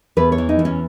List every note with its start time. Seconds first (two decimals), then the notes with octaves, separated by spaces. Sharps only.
0.17 E2 B4
0.32 C#5
0.38 E3
0.49 D#4
0.59 E2
0.65 C#4